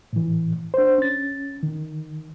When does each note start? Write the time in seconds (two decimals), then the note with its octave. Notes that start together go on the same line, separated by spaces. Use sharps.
0.13 A2 E3
0.74 D4 C5
0.98 C#4 A6
1.63 D#3